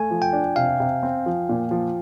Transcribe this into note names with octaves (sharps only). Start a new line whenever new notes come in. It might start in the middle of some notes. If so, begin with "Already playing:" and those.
Already playing: A3 G#5
F3
G5
D4
C3 F5
C3
C4
F3
A#2
F3